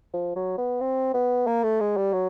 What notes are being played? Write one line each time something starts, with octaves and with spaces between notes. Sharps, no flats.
F3
F#3
B3
C4
B3
A#3
A3
G#3
G3
F#3